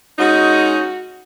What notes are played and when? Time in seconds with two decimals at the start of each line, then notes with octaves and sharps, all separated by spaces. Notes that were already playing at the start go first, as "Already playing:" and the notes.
0.19 G#3 C#4 D#4 F#4